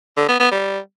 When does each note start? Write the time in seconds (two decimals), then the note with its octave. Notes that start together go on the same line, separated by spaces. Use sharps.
0.17 D3
0.28 B3
0.40 B3
0.51 G3